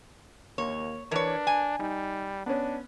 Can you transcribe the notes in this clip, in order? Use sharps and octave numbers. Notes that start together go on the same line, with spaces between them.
D#2 A#3 C#5
E3 D4 A#4 B4 C#5
G#5
G3 D#4
B3 C#4 D4